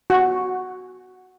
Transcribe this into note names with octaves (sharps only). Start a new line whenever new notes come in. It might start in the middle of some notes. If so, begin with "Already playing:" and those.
F#4